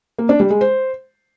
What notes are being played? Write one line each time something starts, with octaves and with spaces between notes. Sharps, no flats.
A#3
D4
G3
G#3
C5